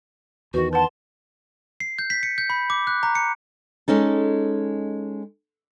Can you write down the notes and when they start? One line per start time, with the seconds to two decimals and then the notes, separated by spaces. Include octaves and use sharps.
0.54 E2 D#3 F#4 B4
0.73 B4 F#5 A5 C6
1.80 C7
1.99 G6
2.10 B6
2.23 C#7
2.38 G6
2.50 B5
2.70 D6
2.87 F#6
3.03 A#5
3.15 C#7
3.88 G#3 C#4 D#4 A4